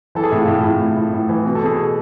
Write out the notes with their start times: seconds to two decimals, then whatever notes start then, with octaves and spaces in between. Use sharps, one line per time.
0.15 E3 A4
0.24 G#4
0.31 A2 E4
0.41 F4
0.48 A2 G#4
0.64 A2
0.81 A2
0.97 A2
1.13 A2
1.29 E3
1.45 B2
1.55 A4
1.62 B2 G#4
1.75 A4